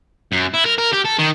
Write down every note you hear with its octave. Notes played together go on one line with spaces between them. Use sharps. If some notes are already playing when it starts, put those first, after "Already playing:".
F#2
E4
A#4
A#4
G4
A4
D#3